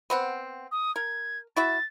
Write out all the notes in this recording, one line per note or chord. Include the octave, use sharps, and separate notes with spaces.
B3 C4 F#5
D#6
A#4 G#6
E4 F#4 E5 A6